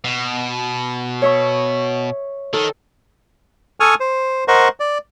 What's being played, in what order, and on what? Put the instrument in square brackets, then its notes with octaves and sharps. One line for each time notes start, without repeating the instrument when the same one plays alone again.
[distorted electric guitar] B2
[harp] C#5 E5 C#6
[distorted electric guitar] D#3 [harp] A4
[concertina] A4 G#5 C#6 D#6 F6
C5
A#4 C5 D#5 F#5 C#6
D5